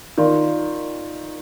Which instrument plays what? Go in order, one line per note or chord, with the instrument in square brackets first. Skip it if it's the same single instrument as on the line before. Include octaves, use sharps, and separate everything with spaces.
[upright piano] D#3 [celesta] F4 A#4 D5 F5 C6